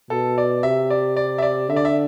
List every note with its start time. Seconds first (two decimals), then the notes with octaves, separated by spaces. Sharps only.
0.10 B2 A4
0.38 D5
0.63 C3 E5
0.90 D5
1.17 D5
1.38 E5
1.42 D5
1.69 D3 E5
1.76 D5
1.85 E5